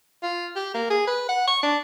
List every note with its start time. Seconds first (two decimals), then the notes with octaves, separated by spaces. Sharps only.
0.23 F4
0.56 G4
0.74 A#3
0.90 G#4
1.07 B4
1.28 F#5
1.47 C#6
1.63 D4